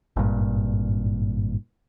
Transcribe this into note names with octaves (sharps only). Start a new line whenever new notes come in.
G#1 G2 A#2